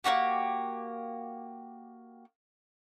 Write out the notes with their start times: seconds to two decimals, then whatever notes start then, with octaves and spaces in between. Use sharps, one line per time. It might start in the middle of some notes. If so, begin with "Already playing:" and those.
0.04 A#3 D#4 F#4 G4